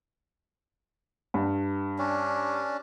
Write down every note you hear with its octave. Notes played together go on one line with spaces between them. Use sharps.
G2
C#4 D4